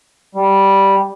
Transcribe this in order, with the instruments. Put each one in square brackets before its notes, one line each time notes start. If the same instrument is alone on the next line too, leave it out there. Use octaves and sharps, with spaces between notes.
[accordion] G3